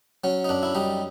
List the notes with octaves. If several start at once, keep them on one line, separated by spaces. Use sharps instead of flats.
F#3 C#4
D#4
F#2 D4
E4
G3 D#4